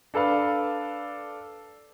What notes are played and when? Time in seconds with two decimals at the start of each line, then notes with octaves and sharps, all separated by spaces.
0.14 D4 A4 B4 F5